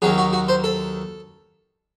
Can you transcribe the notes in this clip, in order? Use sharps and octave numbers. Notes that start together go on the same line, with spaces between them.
D#2 D#3 F#3 G#4
F#4
F#4
C5
A4